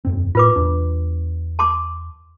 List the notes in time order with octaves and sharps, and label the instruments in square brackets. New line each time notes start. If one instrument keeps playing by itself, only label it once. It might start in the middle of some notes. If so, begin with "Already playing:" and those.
[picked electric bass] E1 F#2 C4
[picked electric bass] A2 [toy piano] F4 B4 D6
[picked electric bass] E2 D4
[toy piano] A5 C6 D6